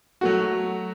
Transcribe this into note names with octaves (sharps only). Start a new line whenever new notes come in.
F#3 A3 F#4